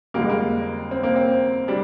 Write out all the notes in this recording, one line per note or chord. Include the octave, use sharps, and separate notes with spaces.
F2 D3 G3 A#3
G#3
A#3
C4
A#3
C4
G3 D4